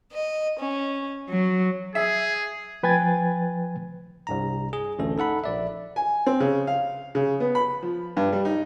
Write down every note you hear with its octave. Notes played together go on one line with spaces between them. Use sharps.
D#5
C#4
F#3
G#4 E5
F3 B4 G5 G#5 G#6 A6
C2 G2 A#5
G#4
A1 D2 C#4 A4
D#4 A4 F#5 B5
A#1 D5 E5
G#5
C4
C#3
F5
C#3
B3
B5
F3
G2
G3
D#4